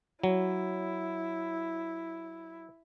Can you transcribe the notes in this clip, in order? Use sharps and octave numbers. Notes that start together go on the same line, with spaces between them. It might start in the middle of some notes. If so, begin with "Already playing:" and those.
F#3 E4